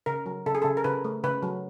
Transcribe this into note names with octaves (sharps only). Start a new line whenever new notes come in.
C#3 A#4
F#3
C#3 A4
G#4
C#3 A4
A#4
C#3 B4
A3
C#3 B4
F#3